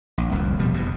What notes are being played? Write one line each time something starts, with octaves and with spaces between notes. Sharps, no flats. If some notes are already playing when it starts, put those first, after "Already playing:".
A#1
D1 C2 F2
D#1 B2 F3 G3
F1 E2 B2